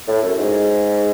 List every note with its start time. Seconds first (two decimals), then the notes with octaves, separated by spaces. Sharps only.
0.08 A2
0.23 F#2
0.39 G#2